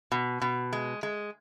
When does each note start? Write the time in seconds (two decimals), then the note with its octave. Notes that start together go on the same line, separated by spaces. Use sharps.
0.12 B2
0.41 B2
0.73 G#3
1.03 G#3